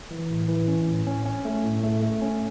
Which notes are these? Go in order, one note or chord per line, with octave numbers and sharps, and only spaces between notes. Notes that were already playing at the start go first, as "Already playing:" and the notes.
E3
A2
E3
C#4
A2
C#4
C#4
A3
A2
A3
A3
C#4